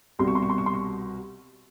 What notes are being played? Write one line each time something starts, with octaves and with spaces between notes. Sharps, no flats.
C2 B2 G3 C6
C#6
C6
C#6
C6
C#6
C6
C#6